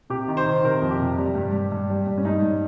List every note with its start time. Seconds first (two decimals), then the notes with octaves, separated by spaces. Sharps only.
0.10 C3 G4
0.28 D#3
0.37 C5
0.46 D#3
0.64 C3 A#4
0.82 F2
0.91 G4
1.00 C3
1.18 G3
1.35 G2
1.53 G2
1.72 G2
1.90 G3
2.07 G2
2.18 C#4
2.25 G2 D#4
2.43 G2